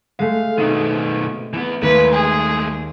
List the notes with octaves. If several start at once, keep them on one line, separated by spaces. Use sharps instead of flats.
G#3 A3 F5
B2 D#3 C4 D#4
E3 B3
D#2 G#3 A3 B4
G#4